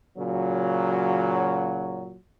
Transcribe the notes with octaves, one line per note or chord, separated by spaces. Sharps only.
A#2 C#3 F#3